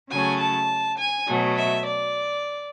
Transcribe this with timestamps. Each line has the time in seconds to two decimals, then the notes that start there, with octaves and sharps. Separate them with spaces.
0.11 C#3 F#3 A3 G#5
0.40 A5
0.98 G#5
1.27 B2 F#3 A3
1.57 E5
1.85 D5